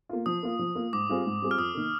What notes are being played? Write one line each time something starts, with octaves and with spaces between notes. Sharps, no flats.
A#3 F4
F3 D#6
A#3 F4
F3
A#3 F4
G#2 D6
G3 C4 F4 G#4
G#2
G3 C4 F4 G#4
F6
F2 D#6
D#3 A#3